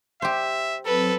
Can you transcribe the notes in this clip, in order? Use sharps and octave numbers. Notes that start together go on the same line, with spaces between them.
G4 C5 E5
F#3 C4 A4 B4